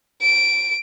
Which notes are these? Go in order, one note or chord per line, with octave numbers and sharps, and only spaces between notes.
D7